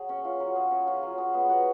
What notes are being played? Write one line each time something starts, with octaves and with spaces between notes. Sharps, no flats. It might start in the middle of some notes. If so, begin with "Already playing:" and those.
Already playing: F#3 G#4
C#4
F4
F#3
G#4
C#4
F4
F#3
G#4
B3
F#4